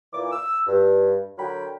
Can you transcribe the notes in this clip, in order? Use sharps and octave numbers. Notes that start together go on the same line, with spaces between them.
A#2 E3 D6
E6
G2
D3 F#3 A#4 G5 B5